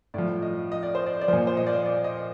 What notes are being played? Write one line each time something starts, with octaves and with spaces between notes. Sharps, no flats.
A2 F3 D5
D#5
D#5
D5
C5
D5
D5
A#2 F3 C5
C5
D#5
D5
D5
D#5